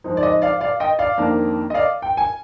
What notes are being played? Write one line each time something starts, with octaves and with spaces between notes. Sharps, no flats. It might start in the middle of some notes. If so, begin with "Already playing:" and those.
G#2 F3 C4 D#4
D5
D#5
D5 F5
D5 F5
D#5 G5
D5 F5
F2 D#3 A#3 D4
D#5
D5 F5
G5
G#5